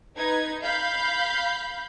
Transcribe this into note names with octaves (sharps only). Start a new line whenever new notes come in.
D#4 B4 G#6
F5 B5 G6